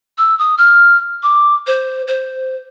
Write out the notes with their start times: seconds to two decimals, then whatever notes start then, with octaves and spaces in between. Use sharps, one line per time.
0.18 E6
0.39 D#6
0.58 F6
1.23 D6
1.67 C5
2.07 C5